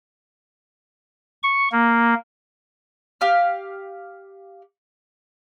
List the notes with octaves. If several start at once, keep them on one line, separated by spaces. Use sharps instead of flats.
C#6
A#3
G4 F5 F6